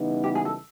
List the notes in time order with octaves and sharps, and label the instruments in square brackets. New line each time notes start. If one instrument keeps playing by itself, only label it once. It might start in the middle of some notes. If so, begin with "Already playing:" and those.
Already playing: [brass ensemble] C#3 E3 G3 B3 D#4
[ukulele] G4
G#4
A4